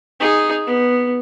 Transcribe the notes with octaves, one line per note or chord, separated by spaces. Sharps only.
D#4 G#4
B3